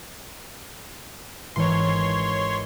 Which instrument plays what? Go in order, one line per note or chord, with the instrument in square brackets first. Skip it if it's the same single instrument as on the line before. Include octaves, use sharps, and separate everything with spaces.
[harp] G#1 E3 C7 [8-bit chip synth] C#5 C6